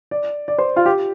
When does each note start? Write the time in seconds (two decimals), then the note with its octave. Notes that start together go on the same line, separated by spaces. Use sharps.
0.11 D5
0.48 D5
0.58 C5
0.76 F4
0.86 G4